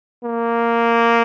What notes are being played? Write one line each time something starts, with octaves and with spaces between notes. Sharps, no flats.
A#3